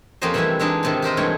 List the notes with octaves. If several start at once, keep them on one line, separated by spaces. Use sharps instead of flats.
F2 A#3 C#4 G4 C5 D#5
C3 E3 G3 A3 C4 E4
E3 G#3 D4 D#4
G#2 C3 D#3
G4 A#4 C5 D#5
G2 E3 G#3 A3 C#5 G5